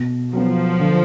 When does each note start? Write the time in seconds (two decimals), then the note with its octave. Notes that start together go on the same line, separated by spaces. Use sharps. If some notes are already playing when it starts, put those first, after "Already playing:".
Already playing: B2
0.33 F3 F#3 B3
0.80 D3